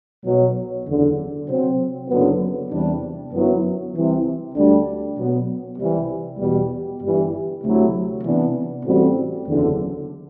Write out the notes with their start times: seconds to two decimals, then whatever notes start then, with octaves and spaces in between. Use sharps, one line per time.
0.24 B1 B2 F#3
0.85 F#1 E2 D3
1.47 C3 F#3 C4
2.09 F#1 F#2 D3 F#3 B3
2.70 E2 C3 G3 D4
3.31 G1 F#2 F#3 B3 E4
3.93 C2 C3 E3
4.54 D2 D3 G3 D4
5.16 B2 F#3 B3
5.77 C2 C3 E3 G3
6.38 E2 B2 G3
7.01 G1 G2 E3 G3
7.62 D2 C3 F#3 A3 E4
8.23 C3 E3 B3 D4
8.85 A1 A2 G3 C4 F#4
9.47 F#1 E2 D3